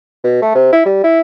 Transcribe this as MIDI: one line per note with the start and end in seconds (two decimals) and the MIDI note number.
0.24 0.41 47
0.42 0.54 57
0.55 0.70 48
0.72 0.82 64
0.85 1.00 55
1.04 1.21 64